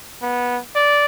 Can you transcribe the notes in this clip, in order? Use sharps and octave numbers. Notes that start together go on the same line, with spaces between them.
B3
D5